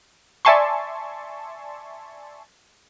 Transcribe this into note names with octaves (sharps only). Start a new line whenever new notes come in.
D5 E5 G#5 A5 C6 C#6